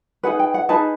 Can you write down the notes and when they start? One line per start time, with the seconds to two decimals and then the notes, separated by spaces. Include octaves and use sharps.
0.23 D#4 G#4 B4 F#5
0.39 G5
0.54 F#5
0.69 D#4 G#4 B4 A5